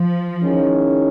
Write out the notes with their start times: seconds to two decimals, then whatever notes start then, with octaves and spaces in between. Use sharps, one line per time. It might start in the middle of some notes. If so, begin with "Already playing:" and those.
Already playing: F3
0.42 D#3 G#3 C#4 E4